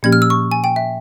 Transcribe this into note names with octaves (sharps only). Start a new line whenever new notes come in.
A#2 F3 A#3 C#4 G4 G#6
F6
E6
C#6
G#5
G5
E5